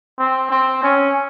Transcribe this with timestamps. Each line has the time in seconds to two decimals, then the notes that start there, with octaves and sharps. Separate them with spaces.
0.19 C4
0.51 C4
0.83 C#4